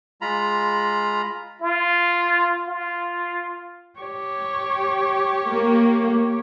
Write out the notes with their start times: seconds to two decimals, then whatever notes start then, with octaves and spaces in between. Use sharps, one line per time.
0.21 G#3 F4 A#5 B5
1.62 F4
2.68 F4
3.99 G4 C#5
5.50 A#3